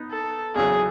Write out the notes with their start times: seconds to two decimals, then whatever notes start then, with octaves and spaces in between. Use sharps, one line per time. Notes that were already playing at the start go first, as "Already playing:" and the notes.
Already playing: B3 D#4
0.12 A4
0.55 E2 C#3 F#3 G#4